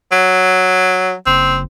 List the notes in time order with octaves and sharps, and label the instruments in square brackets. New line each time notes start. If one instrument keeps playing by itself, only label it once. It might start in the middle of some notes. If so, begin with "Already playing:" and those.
[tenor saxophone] F#3
[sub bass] F#1 [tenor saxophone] C4